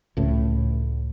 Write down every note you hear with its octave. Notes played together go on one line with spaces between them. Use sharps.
C#2 A2